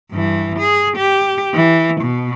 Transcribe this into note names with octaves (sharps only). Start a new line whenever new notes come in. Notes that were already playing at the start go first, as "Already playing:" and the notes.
G2 E3
G#4
G4
E3
B2